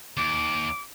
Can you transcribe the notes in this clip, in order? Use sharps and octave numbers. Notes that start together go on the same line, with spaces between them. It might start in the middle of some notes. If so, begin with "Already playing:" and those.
D#2 D6